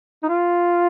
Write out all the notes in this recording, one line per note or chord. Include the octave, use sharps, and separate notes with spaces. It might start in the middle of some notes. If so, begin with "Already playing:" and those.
D#4
F4